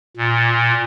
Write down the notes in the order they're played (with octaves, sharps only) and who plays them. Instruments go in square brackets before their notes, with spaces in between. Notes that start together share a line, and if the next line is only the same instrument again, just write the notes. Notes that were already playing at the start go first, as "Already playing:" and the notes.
[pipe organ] A#2